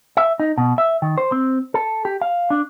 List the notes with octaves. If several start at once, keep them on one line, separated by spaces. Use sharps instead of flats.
E5
D#4
B2
E5
D#3
C5
C4
A4
G4
F5
D4